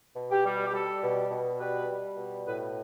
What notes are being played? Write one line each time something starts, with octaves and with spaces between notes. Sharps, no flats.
B2
G4
G3
G4
G3 A4
B2
B2
G3 B4
G3
B2
A2 B4